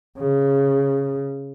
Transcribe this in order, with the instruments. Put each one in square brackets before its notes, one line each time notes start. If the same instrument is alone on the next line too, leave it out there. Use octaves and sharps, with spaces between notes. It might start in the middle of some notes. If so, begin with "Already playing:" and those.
[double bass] C#3